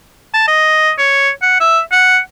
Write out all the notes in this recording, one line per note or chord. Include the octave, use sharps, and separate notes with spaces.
A5
D#5
C#5
F#5
E5
F#5